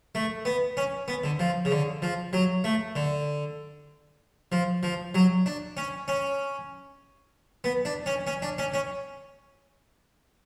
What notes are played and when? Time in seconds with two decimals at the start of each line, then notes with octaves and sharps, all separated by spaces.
0.15 A3
0.45 B3
0.77 C#4
1.08 B3
1.24 D3
1.39 F3
1.65 C#3
1.71 D3
2.02 F3
2.33 F#3
2.64 A3
2.96 D3
4.52 F3
4.83 F3
5.15 F#3
5.46 D4
5.77 C#4
6.08 C#4
7.64 B3
7.85 D4
8.06 C#4
8.27 C#4
8.42 D4
8.58 C#4
8.74 C#4